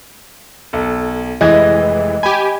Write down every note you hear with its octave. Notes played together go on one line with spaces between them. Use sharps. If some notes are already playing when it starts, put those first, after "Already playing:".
B1 A4
F1 E3 G#3 D#5 G#6
G4 G#5 B5